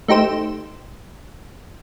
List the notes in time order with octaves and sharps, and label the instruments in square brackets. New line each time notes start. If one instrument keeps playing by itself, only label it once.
[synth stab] A3 D#4 G4 C5 E7